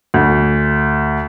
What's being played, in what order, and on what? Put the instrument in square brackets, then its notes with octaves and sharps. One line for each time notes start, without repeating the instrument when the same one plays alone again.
[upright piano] D2